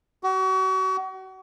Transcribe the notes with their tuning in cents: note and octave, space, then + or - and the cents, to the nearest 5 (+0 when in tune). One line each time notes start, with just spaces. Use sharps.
F#4 +35